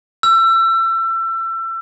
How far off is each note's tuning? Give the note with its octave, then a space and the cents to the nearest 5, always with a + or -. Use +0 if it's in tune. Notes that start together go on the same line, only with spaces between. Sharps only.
E6 +30